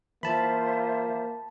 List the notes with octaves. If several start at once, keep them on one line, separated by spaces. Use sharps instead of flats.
E3 A#3 F4 C5 E5 A5 B5